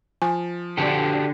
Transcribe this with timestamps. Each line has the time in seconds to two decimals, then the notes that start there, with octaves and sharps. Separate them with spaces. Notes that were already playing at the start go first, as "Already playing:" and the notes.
0.22 F3 G#5
0.77 D3 F#4 G4 A4